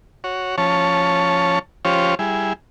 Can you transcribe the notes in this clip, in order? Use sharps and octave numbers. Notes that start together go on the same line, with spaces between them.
F#4 C#5
F3 C#4 C#5 A5
F3 C#4 F4 G4 C5 C#5
G3 E4 G#4